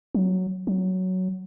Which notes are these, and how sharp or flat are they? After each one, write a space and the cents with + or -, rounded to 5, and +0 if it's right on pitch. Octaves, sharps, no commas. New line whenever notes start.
F#3 +0
F#3 +5